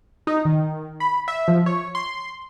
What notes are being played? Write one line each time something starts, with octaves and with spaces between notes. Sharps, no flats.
D#4
D#3
B5
E5
F3
C#5
C6